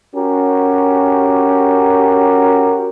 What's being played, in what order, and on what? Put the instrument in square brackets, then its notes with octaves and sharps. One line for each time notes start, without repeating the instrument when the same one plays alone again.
[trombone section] C#4 F#4 G4 A#4